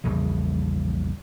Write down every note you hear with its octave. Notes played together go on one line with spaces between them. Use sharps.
A#1 E2 C#3 G3